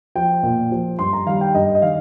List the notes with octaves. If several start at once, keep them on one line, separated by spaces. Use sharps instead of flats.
F3 G5
A#2
F3
G2 C6
A#5
D#3 G3 F5
G5
G2 D#5
D#5
D#3 F5